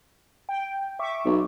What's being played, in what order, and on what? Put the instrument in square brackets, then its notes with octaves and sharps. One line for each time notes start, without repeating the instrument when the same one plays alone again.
[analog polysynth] G5
E5 C#6 D6
[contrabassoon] B1